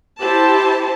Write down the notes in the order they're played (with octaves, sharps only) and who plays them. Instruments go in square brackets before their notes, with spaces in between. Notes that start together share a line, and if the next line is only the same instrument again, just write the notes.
[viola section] E4 G4 C5 A5